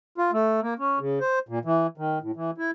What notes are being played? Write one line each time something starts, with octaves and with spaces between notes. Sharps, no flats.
F4
A3
A#3
C#4
C#3
C5
A#2
E3
D#3
A2
E3
E4